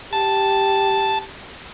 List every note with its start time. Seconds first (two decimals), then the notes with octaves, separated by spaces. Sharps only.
0.13 G4 A5